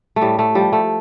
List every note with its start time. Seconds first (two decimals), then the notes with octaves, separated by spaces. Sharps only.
0.16 A3
0.21 A2 G3
0.39 A3
0.55 F3 G3
0.72 A3